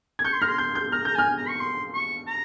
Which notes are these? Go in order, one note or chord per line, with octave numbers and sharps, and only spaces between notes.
G#6
C#6 G6
C6
A#5 F6
C6
C6 G6
G6
A#5 F6
A#5 G6
G#5 F6
A#5
C#6
C6
C#6
A#5